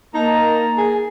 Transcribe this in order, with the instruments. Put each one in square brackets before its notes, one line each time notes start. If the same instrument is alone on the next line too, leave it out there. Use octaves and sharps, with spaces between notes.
[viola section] A#3 [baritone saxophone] D#4 [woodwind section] A5 A#5
[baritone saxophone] G#4